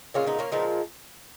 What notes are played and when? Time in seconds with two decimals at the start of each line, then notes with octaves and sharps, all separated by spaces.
0.14 A#2 G#3 C#4 F4
0.26 B3 D#4
0.39 A#3 C#4
0.52 A#2 F3 G#3 B3 D#4